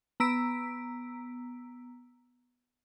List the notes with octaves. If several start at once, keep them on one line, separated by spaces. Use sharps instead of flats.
B3 A#5 E6 B6 D7